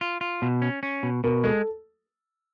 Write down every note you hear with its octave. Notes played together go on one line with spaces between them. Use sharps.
F4
F4
B2
C#4
C#4
B2
B2 A#4
G#3 A4